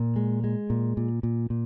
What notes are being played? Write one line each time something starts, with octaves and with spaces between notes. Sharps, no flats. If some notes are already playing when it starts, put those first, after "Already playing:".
Already playing: A#2
G#3
G#3
A#2
A#2
A#2
A#2